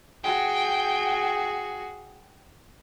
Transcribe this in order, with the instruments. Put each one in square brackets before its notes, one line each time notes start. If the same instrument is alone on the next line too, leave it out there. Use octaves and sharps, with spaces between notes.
[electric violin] F#4 G#4 [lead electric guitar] G5